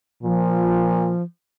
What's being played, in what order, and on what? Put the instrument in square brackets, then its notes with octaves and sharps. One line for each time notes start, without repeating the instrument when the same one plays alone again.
[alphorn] A#2 [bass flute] F3